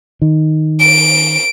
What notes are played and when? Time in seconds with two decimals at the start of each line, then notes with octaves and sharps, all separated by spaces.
0.22 D#3
0.80 D7